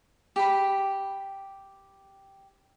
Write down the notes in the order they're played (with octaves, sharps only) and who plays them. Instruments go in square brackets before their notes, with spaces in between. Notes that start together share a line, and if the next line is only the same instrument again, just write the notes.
[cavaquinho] G4 B5